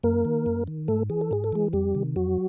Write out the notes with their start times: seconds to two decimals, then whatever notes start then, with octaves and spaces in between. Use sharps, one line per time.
0.03 F#2 A#3 A#4
0.25 D#3
0.46 F#2
0.67 D#3
0.88 G#2 A3 A4
1.10 E3 G#4
1.21 A4
1.31 G#2 G#4
1.44 A4
1.52 E3 G#3 G#4
1.73 F2 G3 G4
1.95 C3 D#3
2.16 F2 F#3 F#4